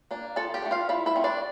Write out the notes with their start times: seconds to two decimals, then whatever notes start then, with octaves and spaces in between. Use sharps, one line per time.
0.11 A#3 D4
0.36 F3 A4 A5
0.54 G4 G5
0.62 A3 D4
0.71 F4 F5
0.89 F3 E4 E5
1.06 E4 E5
1.16 A3 C4
1.24 D4 D5